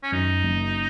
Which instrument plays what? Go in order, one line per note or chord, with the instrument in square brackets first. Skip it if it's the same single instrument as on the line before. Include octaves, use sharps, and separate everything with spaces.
[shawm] C#4
[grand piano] F#2 [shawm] D#4
[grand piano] F#1